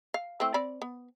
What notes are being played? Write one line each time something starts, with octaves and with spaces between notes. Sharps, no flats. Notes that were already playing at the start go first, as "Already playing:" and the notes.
F5
A3 C4 E4
C4 D5 B5
B3